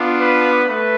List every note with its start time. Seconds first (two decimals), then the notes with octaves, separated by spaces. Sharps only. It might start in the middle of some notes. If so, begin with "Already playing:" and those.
Already playing: B3 D4 F4
0.19 B4
0.67 A3 B4